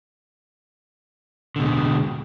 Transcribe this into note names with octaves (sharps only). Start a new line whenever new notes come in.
B2 D3 G#3